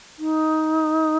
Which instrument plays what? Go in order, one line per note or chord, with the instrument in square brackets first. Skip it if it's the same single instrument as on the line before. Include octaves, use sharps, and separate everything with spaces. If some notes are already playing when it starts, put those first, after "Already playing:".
[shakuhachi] D#4